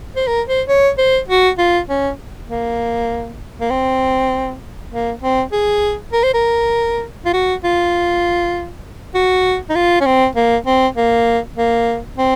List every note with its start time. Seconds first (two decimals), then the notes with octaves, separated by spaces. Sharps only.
0.16 C5
0.27 A#4
0.48 C5
0.68 C#5
0.98 C5
1.28 F#4
1.58 F4
1.89 C#4
2.49 A#3
3.61 A#3
3.70 C4
4.91 A#3
5.22 C4
5.52 G#4
6.13 A#4
6.23 C5
6.34 A#4
7.25 F4
7.34 F#4
7.64 F4
9.15 F#4
9.69 D#4
9.75 F4
10.01 C#4
10.06 C4
10.36 A#3
10.66 C4
10.97 A#3
11.56 A#3
12.17 C4